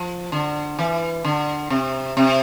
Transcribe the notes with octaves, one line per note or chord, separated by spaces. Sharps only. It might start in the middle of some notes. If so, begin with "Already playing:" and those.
Already playing: F3
D3
E3
D3
C3
C3